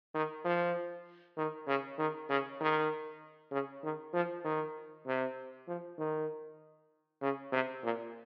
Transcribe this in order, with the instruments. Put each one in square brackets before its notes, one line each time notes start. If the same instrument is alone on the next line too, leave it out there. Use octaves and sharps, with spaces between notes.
[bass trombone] D#3
F3
D#3
C#3
D#3
C#3
D#3
C#3
D#3
F3
D#3
C3
F3
D#3
C#3
C3
A#2